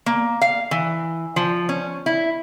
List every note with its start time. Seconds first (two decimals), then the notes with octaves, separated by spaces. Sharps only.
0.06 A#3
0.41 F5
0.71 E3
1.36 F3
1.69 C#4
2.06 E4